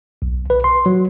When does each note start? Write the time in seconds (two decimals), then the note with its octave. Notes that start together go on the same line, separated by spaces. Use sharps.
0.22 B1
0.50 B4
0.64 C6
0.86 F#3